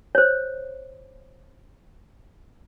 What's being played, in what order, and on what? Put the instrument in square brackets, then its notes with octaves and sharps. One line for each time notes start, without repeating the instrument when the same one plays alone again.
[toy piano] C5 C#5